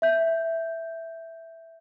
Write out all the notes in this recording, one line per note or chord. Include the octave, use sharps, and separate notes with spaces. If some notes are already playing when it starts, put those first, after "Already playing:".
E5 G6